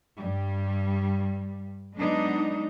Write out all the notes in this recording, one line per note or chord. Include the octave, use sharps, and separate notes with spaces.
G2 G3
F#3 G#3 B3 D4 D#4